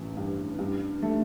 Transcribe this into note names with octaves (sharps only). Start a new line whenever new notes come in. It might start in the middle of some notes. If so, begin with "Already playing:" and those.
Already playing: A1 E3
G2
G2
A3